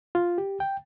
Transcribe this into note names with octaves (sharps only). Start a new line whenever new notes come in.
F4
G4
G5